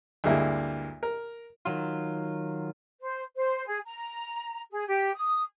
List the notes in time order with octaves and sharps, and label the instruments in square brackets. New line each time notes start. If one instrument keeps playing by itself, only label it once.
[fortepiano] D2 G2 G#3 A#3 E4
A#4
[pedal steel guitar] D#3 F#3 F4
[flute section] C5
C5
G#4
A#5
G#4
G4
D#6